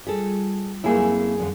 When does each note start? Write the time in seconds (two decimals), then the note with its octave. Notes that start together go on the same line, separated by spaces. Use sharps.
0.07 G3 F4 G#4 A4
0.84 F#2 A3 A#3 E4 G#4
0.97 C4 G#5
1.40 F2 D3